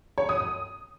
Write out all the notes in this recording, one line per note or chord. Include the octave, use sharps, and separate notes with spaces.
C#5
D#6
D#6